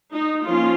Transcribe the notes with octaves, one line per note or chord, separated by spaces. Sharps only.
D#4
F3 A#3 C#4 F4